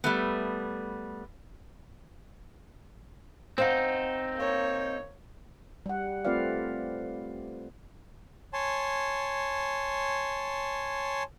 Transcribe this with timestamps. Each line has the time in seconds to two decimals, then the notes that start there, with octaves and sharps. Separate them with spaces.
0.04 G3 A3 B3
3.58 C4 D#4 C5 F5 F#5
4.36 A#3 C#5
5.86 G3 F#5
6.25 A3 C4 F4 B4 D5 F5
8.53 C#5 G#5 A5 C6